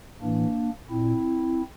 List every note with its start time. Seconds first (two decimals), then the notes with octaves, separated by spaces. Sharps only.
0.21 A2 E3 A#3 D4
0.90 A#2 C4 E4